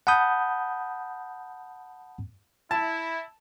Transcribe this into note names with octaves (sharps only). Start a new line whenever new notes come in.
F#5 A5 B5 D#6 G6
E4 A5